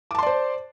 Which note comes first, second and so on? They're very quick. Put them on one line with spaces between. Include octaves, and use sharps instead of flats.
D6 A5 C6 D5 C5